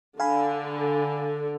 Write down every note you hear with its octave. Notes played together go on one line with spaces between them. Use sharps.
D3 F5 G#5 B5